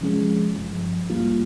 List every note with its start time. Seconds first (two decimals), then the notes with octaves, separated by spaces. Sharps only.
0.01 C3 F3 G#3 C#4 G#4
0.55 G1 G2 F3
1.10 A#1 G#2 G3 A#3 F4